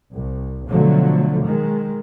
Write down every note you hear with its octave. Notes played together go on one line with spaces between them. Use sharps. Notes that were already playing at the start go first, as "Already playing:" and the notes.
C2
B2 D3 F3 F#3 A3
D#3 G#3